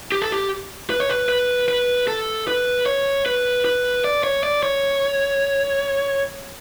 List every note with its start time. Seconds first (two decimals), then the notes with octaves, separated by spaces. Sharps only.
0.12 G4
0.22 A4
0.32 G4
0.90 B4
1.00 C#5
1.10 B4
1.29 B4
1.68 B4
2.07 A4
2.48 B4
2.86 C#5
3.26 B4
3.65 B4
4.04 D5
4.24 C#5
4.43 D5
4.63 C#5